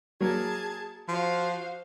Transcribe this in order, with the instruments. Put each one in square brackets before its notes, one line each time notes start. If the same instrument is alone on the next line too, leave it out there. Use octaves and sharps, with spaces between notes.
[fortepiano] F#3 A#3 [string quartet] G#4 A5 G#6
[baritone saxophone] F3 [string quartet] F#4 C5 F5